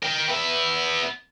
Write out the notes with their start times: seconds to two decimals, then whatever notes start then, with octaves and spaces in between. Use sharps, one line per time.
0.03 A#4 G5
0.28 B3 E5